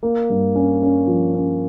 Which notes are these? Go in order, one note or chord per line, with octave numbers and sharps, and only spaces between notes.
A#3
G2
C#4
C#4
F3
C#4